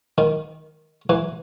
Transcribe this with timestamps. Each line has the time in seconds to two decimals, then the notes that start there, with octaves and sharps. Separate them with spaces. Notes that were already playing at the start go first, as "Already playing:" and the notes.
0.18 D#3
1.09 E3